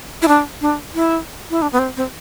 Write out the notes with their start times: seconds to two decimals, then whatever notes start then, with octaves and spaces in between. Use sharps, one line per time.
0.22 E4
0.28 D4
0.61 D4
0.95 E4
1.50 E4
1.62 D4
1.72 B3
1.79 C4
1.97 C4